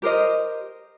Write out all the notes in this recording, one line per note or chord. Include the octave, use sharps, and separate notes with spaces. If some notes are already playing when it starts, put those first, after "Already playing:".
G4 A#4 C5 D#5